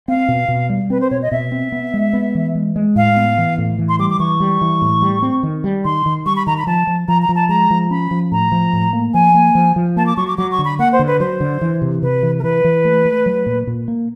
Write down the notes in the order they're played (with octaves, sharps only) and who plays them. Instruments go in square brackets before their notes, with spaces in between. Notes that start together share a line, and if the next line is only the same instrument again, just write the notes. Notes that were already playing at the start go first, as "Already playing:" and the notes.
[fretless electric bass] C4 [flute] F5
[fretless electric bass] B2
B2
G3
[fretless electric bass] C4 [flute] B4
[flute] C5
[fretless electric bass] B2 [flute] C#5
[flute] D#5
[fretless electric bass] B2 [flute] E5
[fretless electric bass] C4
B3
G#3
B3
E3
G#3
G#3
[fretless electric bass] A2 [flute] F5
[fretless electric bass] B3
E3
A2
E3
[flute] C6
[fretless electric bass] G3 [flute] D6
[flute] D6
[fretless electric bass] E3 [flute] C#6
[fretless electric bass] G3
E3
A2
G3
C4
D#3
G3
[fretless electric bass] D#3 [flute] C6
[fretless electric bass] D#3
[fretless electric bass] G3 [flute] C#6
[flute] B5
[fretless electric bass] D#3 [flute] A#5
[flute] B5
[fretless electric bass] F3 [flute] A5
[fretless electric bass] F3
[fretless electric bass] F3 [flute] A#5
[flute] A#5
[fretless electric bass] F3
[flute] A5
[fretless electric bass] G#3 [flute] A#5
[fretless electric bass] F3
[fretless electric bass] C#4 [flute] B5
[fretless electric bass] F3
[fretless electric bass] A2 [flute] A#5
[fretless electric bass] F3
A2
A#3
[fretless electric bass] F3 [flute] G#5
[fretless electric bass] A#3
F3
F3
[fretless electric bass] A#3 [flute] A5
[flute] D6
[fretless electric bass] F#3 [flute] C#6
[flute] D6
[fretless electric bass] F#3 [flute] D6
[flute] C#6
[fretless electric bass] D3
[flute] B5
[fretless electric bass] A#3 [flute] F#5
[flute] C5
[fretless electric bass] D3
[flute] B4
[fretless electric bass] F#3 [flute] C5
[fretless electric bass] D3
E3
C3
[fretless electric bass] C3 [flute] B4
[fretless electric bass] E3
[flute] A#4
[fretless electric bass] E3 [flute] B4
[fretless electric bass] E3
A3
A3
F#3
A#2
A#2
A#3